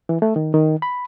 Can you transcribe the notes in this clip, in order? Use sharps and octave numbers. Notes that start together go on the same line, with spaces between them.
E3
A3
D#3
D#3
B5